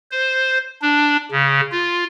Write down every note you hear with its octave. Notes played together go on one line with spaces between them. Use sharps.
C5
D4
C#3
F4